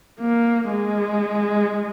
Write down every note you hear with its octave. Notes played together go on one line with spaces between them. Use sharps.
A#3
G#3